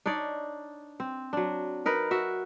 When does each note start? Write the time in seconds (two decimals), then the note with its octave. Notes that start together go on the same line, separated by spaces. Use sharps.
0.06 D4 D#4 C#5 D5
1.00 C4
1.33 F#3 D4
1.86 D#4 A#4 B4
2.11 F#4 E5